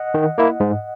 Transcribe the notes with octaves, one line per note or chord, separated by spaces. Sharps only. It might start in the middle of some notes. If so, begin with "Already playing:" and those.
Already playing: D#5 F#5
D#3
A#3 E4
G#2